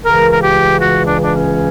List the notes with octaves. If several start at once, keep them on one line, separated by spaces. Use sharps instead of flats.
C#2 C#3 E3 A#4
A#4
G4
F#4
D4
D4
C#4